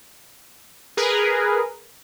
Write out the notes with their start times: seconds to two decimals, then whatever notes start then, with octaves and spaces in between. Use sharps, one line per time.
0.97 G#4 A#4 B4